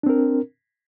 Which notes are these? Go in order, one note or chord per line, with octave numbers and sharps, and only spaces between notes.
C4 D4 A#4